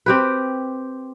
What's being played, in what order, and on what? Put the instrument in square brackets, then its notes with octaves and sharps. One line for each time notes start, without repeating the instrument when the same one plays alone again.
[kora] C4 G4 B4